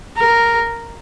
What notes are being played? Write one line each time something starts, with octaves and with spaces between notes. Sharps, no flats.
A#4